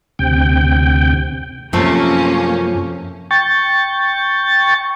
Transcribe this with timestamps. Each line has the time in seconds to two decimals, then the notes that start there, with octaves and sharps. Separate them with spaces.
0.19 D2 C3 G5
1.73 F#2 C3 F3 A3 A#3 C#4
3.31 G5 C#6 A6